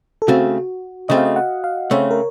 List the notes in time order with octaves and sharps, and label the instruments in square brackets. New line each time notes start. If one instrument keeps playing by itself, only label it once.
[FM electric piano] A4
[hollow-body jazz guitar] C#3 A3 C4 [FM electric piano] F#4
[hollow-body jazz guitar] C#3 A3 C4 [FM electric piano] D#5
[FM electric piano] F5
D#5
F#5
F5
[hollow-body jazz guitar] C#3 A3 C4 [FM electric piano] C#5
[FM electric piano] A#4